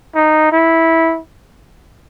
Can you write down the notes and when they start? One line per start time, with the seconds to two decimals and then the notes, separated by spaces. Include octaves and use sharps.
0.15 D#4
0.52 E4